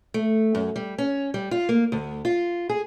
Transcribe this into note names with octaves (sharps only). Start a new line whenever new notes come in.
A3
F#2
G3
C#4
G3
F4
A#3
D2
F4
G#4